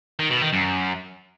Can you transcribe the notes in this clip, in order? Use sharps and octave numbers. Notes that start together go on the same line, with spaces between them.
D#3
B2
D#3
F#2